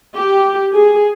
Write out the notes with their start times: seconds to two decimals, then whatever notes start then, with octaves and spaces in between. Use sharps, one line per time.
0.18 G4
0.74 G#4